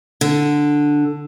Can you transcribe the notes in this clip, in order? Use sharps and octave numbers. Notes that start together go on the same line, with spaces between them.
D3